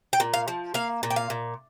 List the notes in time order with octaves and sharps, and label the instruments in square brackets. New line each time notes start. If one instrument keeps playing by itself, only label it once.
[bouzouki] G5
A#2
F5
F3
A#3 F5
A#2
G5
F5
A#2